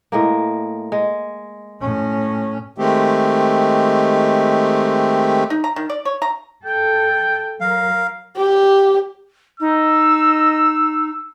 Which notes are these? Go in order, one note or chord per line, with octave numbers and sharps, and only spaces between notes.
A2 G#3 A#3
G#3
A2 C#4
D#3 G#3 A3 C4 G4
D#4
A#5
D#3
D5
C#5
A#5
A4 G5
F#3 A#4 F5
G4
D#4 E6